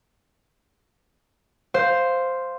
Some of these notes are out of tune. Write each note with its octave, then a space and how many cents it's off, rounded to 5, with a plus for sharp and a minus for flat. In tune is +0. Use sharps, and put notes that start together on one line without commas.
C5 +0 F5 +0